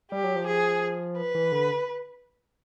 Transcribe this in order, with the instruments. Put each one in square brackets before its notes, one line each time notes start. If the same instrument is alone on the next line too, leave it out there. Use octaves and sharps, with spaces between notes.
[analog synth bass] G3 [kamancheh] G4
[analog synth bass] F#3
F3
[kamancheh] G#4
B4
[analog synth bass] E3
D3